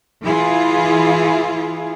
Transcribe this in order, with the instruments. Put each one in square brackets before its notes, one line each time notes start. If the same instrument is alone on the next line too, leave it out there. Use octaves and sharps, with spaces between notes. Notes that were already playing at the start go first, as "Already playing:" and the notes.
[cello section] E3 E4 F4 G#4